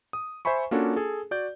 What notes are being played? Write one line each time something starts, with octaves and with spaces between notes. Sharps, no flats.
D#6
C5 E5 G#5 B5 C#6
A#3 C#4 D4 F4 F#4 A4
G#4 A4
F#4 D5 G6